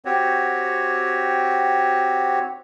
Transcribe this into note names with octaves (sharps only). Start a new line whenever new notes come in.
C4 F#4 G4 C#5